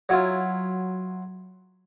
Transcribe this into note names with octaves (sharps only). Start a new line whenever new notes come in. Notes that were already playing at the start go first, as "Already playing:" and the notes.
F#3 E4 F4